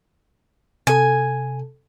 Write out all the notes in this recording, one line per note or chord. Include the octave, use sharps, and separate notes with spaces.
C3 A4 G#5